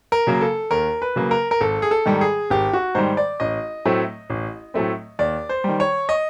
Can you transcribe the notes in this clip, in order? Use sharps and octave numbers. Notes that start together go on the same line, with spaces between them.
A#4
C#3 F#3 A#3
A4
D#2 A#4
B4
C#3 F#3 A#3
A#4
A#4
G#1 A4
G#4
A4
G#2 D#3 G3
G#4
G#1 G4
F#4
G#2 D#3 G3 C5
D5
A1 D#5
A2 F#3 A3 C4
A1
A2 F#3 A3 C4
D#2 D5
C5
D#3 G3
C#5
D#5